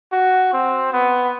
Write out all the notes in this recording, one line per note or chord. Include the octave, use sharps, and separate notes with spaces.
F#4
C4
B3